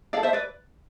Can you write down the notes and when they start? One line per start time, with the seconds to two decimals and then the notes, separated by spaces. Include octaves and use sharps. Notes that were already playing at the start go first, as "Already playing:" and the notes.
0.13 E4 D5 F5
0.17 A4
0.23 C5 E5
0.33 B4 D5